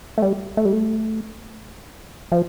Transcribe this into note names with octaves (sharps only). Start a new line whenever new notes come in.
A3
G3
A3
G3
A3
F3